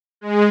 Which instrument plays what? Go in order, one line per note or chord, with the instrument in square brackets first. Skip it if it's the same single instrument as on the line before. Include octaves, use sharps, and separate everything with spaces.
[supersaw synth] G#3